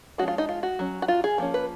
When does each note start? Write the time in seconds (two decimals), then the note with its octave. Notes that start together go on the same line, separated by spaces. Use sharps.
0.18 F3 G#3 C#4 F#4
0.28 F4
0.38 D#4
0.49 F4
0.63 F#4
0.79 F#3 C#4
1.02 F#4
1.08 F4
1.24 G#4
1.38 F3 A#3 C#4
1.54 B4